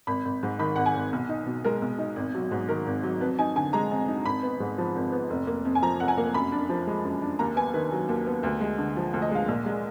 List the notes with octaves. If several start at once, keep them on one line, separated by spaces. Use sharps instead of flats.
G#1 B5
G#1
G#2
D#3 B5
G#1 F#5
G#5
G#1
B1
D#4
B2
G#3 A#4
B1
D#4
G#1
F#3
G#2
D#3 A#4
G#1
F#3
F2 B4
D#4 G#5
D3 G#5
G#3 A#5
F2
D#4
G#1 B5
B3
G#2
F3
G#1
B3
F1
A#3
F2
G#5
F3 A#5
F1 F#5
G#5
A#3
F#2 B5
D4
F3
G#3
F#2
D4
D#2 A#5
B3 G#5
D#3 B4
F#3
D#2
B3
D2
G#3
D3
F3
D2
D#5
G#3 F5
A#1
G#3